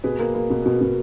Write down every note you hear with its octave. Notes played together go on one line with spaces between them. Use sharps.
B2 G#4 B4
A#3
A#3
B2
B2
B2